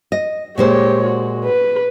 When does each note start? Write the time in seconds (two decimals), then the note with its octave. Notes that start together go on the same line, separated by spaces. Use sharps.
0.12 D#5
0.58 A#2 G#3 G4 C5 C#5
1.04 F#4
1.45 B4